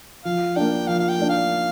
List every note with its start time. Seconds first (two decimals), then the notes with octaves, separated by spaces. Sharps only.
0.25 F3 F5
0.56 A#3 D4 G5
0.87 F3 F5
0.99 F5
1.09 G5
1.19 A#3 D4
1.29 F5